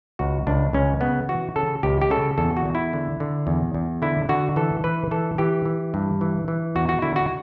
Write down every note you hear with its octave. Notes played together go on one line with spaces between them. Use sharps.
C#2 F#4
C#2 D4
C#2 C#4
C#3 B3
E3 F#4
C#3 A4
C#2 G4
G4
C#3 A4
E2 A4
F#4
E2
E4
D3
D3
E2
E2
D3 E4
D3 F#4
E3 A4
E3 B4
E3 A4
E3 G4
E3
G2
E3
E3
E2 F#4
F#4
D3 E4
F#4